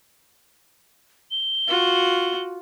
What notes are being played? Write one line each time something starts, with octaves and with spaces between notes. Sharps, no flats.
G7
F4 F#4